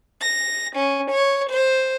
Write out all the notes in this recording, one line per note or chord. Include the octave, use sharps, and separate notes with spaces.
A#6
C#4
C#5
C5